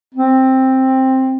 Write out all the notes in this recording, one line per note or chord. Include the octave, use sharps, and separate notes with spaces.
C4